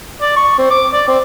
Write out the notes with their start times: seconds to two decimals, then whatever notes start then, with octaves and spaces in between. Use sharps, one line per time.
0.22 D5
0.37 C#6
0.58 C4
0.71 D6
0.94 D5
1.08 C4